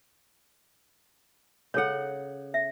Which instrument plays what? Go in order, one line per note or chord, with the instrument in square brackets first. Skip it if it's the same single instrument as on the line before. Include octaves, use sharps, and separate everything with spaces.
[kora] C#3 F#5 [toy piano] A4 C#5
[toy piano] E5